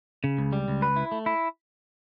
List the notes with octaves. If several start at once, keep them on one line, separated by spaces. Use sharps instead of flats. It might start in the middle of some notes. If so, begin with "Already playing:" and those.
C#3
C#2
G3
C#2
B4
E4
A3
E4